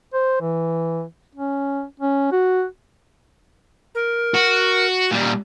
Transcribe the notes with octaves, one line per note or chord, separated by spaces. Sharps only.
C5
E3
C#4
C#4
F#4
A#4
F#4
A#2 G3